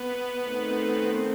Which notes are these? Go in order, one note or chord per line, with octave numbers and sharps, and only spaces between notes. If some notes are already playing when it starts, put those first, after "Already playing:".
Already playing: B3
D#3 A3 C4